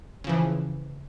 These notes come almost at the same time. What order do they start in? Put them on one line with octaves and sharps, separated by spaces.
C#3 F3 E3